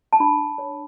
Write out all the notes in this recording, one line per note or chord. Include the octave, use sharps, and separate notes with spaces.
A5
D4 B5
C#5